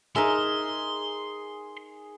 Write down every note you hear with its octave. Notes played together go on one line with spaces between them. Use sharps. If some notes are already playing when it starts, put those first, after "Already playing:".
D#4 G#4 A#4 E5 C6